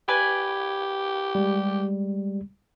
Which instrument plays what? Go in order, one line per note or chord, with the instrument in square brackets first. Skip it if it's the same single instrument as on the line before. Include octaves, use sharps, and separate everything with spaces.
[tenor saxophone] G4 [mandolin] B4 D5 G#5
[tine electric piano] G3 G#3